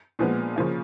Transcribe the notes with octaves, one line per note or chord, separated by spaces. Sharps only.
A#2 F3 G#3 B3
C#3 F3 A#3